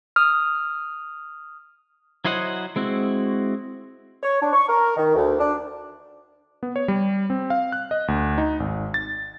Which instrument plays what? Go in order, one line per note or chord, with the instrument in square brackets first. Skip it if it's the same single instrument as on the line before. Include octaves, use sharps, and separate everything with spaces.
[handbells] D#6 F6
[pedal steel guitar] F#3 E4 C5 D#5 F#5
G#3 C4 E4 F#4
[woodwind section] C#5
D4
C#6
A#4
D#3
D2
D4
[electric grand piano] B3
C#5
G3
C4
F5
F#6
D#5
D2
D#4
G#1
A6